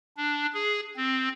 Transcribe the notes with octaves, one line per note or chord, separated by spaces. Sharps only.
D4
G#4
C4